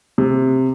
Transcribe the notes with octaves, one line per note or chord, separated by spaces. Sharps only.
C3